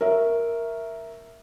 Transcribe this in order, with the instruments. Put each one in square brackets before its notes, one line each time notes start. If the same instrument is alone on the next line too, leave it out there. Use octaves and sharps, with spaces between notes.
[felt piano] A#4 C#5 E5